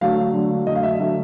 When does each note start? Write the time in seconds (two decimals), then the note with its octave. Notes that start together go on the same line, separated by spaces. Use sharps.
0.01 D3 F#3 A3 F5
0.33 D3 F#3 A3
0.66 D3 F#3 A3 D#5
0.75 F5
0.83 E5
1.00 D3 F#3 A3 E5